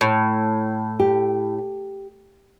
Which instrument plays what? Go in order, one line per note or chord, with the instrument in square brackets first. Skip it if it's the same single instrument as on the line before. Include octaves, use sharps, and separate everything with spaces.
[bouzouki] A2
[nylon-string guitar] G4